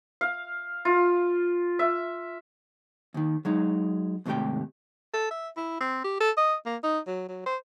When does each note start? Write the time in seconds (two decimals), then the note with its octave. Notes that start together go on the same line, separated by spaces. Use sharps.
0.21 F5
0.85 F4
1.79 E5
3.14 D#2 D#3
3.45 F#3 G#3 D#4
4.26 D#2 G#2 C3 A3 G4 G5
5.14 A4
5.31 E5
5.57 E4
5.81 C4
6.04 G4
6.20 A4
6.37 D#5
6.66 A#3
6.84 D#4
7.07 F#3
7.29 F#3
7.46 C5